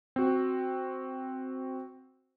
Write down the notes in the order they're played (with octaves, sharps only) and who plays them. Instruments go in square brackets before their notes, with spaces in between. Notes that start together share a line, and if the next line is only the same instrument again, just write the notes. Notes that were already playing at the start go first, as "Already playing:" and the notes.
[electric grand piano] C4 F#4